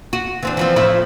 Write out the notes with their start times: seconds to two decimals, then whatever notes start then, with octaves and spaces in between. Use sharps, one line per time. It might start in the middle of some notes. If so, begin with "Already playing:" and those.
0.13 F#4
0.43 E3 C4 D4
0.57 E3 F3 C4
0.76 A2 F3 E4